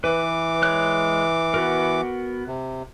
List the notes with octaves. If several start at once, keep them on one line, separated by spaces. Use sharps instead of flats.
E3 B4 D6
G#3 C#5 F#6
B3 F#4 A#4
C3